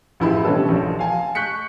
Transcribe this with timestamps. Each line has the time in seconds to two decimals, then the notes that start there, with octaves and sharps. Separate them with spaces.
0.20 A1 F3 E4 G#4 B5
0.44 B2 G3 C#4 D4 A4 B4
0.69 A#1 F3
0.99 F5 G#5 A5
1.35 C#6 F#6 G6 B6 C#7